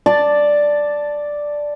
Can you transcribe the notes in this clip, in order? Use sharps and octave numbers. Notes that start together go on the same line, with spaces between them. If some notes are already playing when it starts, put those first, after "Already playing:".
D5 A5